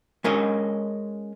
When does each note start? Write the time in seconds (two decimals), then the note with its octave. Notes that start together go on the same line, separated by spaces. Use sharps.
0.24 G#3 C#4 A#4 C#5 D#5